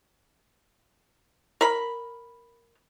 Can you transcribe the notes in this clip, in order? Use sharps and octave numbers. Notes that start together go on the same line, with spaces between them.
A#4 B5